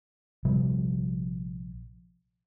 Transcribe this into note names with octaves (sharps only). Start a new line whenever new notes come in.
A#1 C3 F3 G3